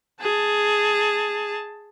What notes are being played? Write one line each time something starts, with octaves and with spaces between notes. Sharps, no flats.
G#4 A5